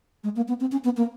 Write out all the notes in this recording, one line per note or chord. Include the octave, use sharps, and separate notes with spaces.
G#3
A#3
B3
C4
C#4
B3
A#3